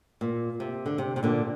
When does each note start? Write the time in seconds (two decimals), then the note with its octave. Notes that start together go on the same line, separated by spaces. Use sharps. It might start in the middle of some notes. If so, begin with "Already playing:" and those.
0.21 A#2
0.60 C3
0.86 D3
0.98 C3
1.16 C3
1.23 A#2 D3